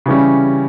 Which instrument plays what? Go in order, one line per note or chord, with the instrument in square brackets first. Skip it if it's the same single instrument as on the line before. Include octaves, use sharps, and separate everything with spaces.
[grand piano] C#3 E3 G3 C#4